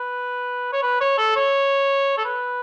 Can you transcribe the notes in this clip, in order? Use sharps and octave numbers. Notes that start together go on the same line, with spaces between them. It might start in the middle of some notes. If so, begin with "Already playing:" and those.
Already playing: B4
C#5
B4
C#5
A4
C#5
A4
B4